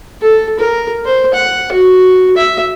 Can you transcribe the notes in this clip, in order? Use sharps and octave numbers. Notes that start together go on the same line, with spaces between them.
A4
A#4
C5
F#5
F#4
E5